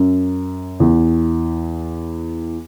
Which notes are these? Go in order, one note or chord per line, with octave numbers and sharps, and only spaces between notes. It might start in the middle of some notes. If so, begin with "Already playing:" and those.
Already playing: F#2
E2